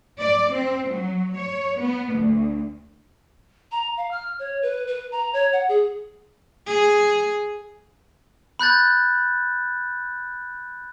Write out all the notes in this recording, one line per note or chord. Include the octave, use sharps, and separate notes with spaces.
D5
C4
F#3
C#5
B3
D2
A#5
F5
F6
C#5
B4
B4
A#5
C#5
F#5
G#4
G#4
B5 F#6 G6 A6